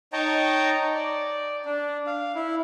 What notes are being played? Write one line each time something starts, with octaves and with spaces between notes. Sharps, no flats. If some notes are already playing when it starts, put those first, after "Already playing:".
D#4 C#5 D#5 G5 A5 A#5
D5
D4
F5
E4